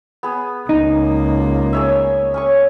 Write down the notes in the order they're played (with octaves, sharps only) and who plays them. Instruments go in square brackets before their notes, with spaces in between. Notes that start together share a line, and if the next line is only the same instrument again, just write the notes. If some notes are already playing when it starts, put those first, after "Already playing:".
[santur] B3 G#4
[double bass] C#2 A#3 [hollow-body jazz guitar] D#4
[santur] G#4 C#5 E5
C#4 G#5 C#6